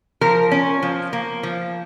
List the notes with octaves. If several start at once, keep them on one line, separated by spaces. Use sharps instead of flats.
F3 A#4
C#4
F3
A#3
F3